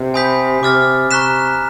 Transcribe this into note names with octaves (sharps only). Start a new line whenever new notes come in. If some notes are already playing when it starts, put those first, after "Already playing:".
Already playing: C3
G#5 B5 D#6 G6 B6
C3 D6 F6 A6
C3 A#5 C#6 F#6 B6 E7